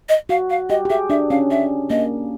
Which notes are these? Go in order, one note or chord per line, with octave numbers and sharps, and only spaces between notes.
D#5
F#4 F5
F5
G4 D#5
G4
G#4 E5
D4 E5
C#4 F5
E5
A#3 D#5